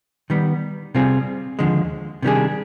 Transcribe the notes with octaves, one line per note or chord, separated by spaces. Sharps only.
D#3 G3 B3
C3 G3 C4 F4 G#4
D#2 D3 F3 G#3
C3 D#3 G3 D4 G#4